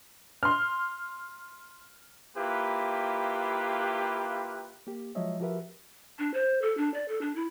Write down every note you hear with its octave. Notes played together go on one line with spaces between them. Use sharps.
C6 F6
A#3 E4 F4 G4 B4
A#3 G4
F3 F#3 G#3 C#5 D#5 E5
F3 F#4 G4 A#4 B4 E5
D4
C5
A4
D4
D5
A4
D4
E4